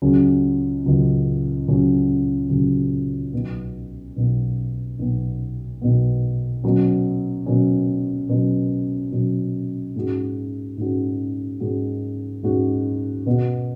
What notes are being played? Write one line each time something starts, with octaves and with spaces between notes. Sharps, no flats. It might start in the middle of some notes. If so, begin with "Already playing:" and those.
C#2 C#3 F#3 C#4
C#2 C#3 F#3 C#4
C#2 C#3 F#3 C#4
C#2 C#3 F#3 C#4
B1 B2 B3
B1 B2 B3
B1 B2 B3
B1 B2 B3
B2 F#3 C#4
B2 F#3 C#4
B2 F#3 C#4
B2 F#3 C#4
G#2 G#3 C#4 F#4
G#2 G#3 C#4 F#4
G#2 G#3 C#4 F#4
G#2 G#3 C#4 F#4
B2 B3 F#4